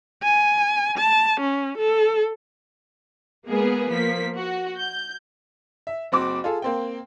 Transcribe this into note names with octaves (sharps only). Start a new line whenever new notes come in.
G#5
A5
C#4
A4
G#3 A#3 B3 G#4
F3 A#3 B6
F#4
G6
E5
F#1 C4 F#4 D6
F4 G#4 A4
A#3 C4 G5